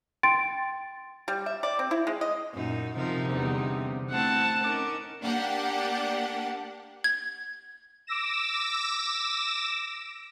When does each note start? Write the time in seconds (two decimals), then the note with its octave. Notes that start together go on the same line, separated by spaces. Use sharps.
0.23 G5 C6 A6 D7
1.28 G3
1.46 E5
1.63 D5
1.79 C4
1.91 E4
2.07 G#3
2.21 D#5
2.54 F#2 A#2 D#4
2.97 C3 F3 D#4 A#4
3.30 E2 D3 G3
4.11 A3 C4 E4 F#5 A5
4.64 C#4 D#4 A#4 D6
5.23 A#3 D4 G4 F#5
7.04 G#6
8.07 D6 E6 A#6 E7